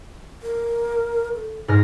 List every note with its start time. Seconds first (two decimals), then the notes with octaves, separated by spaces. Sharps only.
0.42 A#4
1.35 A4
1.68 G#2 G#4 F6 A#6